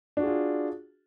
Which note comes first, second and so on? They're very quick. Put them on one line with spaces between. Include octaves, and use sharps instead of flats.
D4 F#4 G#4 F4